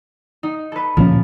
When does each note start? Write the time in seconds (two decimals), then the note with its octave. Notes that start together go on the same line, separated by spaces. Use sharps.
0.43 D#4
0.72 A4 B4
0.97 D2 A#2 F3 C#4